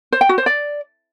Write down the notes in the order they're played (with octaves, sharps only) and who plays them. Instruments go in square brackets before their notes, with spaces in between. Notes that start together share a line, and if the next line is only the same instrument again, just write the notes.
[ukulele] C5
G5
F#4
C5
D5